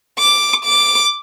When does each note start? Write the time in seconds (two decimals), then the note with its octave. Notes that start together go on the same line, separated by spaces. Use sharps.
0.19 D6
0.65 D6